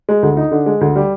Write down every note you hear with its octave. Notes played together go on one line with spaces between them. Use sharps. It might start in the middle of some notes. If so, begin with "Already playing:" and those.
G#3
D2
D#4
D3
G#3
D2
G3